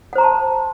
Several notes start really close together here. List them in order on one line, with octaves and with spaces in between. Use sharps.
F#5 C5 A#5 C6 A5